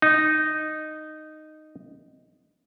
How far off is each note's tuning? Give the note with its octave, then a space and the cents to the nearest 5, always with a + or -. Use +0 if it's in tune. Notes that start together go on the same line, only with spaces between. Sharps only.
D#4 -10